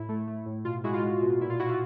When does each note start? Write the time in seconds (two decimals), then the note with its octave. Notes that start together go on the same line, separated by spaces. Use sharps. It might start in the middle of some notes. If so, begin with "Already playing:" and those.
Already playing: A2 E4
0.09 A3
0.28 A3
0.46 A2
0.65 B2 F4
0.84 G#3 E4 F#4
0.94 F4
1.03 G#3
1.22 B2
1.41 A#2 E4
1.50 F4
1.59 A#2 E4 F#4
1.69 F4